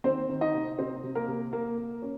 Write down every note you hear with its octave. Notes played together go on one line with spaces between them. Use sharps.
D#3 C4 C5
D#3
D#4 D#5
C3
C3 C4 C5
C3
A#3 A#4
C3
A#3 A#4
A#3
C#4